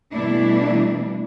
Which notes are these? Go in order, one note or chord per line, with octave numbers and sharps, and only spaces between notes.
B2 E3 G3 A3 D4 E4